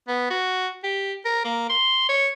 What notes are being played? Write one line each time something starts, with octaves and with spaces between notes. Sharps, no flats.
B3
F#4
G4
A#4
A#3
C6
C#5